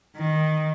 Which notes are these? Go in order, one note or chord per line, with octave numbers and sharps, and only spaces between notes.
D#3